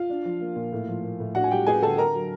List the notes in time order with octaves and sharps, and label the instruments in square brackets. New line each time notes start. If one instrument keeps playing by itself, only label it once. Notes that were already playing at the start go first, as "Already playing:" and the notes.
Already playing: [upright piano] F4 F5
D4
F3
A#3
A#2
A2
F3
A#3
A2
D4 F#4 F#5
G#5
G3 G4 G5
B3 G#4 G#5
D3 A4 A5
D4 A#4 A#5
F#3